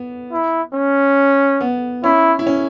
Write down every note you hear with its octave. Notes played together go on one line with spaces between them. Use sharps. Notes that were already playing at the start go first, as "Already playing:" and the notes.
Already playing: B3
E4
C#4
B3
C#4 E4
E4
C#4